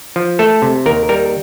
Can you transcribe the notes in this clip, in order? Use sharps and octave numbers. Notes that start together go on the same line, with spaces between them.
F3
A3 A4
C3
D#2 A#4
G3 A#4